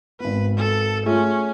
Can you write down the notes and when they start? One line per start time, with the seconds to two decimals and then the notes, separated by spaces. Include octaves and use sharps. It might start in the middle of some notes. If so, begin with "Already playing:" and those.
0.20 G#1 B3 B4
0.56 A4
1.06 A3 C#4 F4 G#4